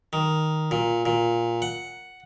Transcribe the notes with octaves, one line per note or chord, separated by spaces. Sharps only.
D#3
A#2
A#2
F#5